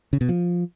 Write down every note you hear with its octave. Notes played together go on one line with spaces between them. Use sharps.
C#3
B2
F3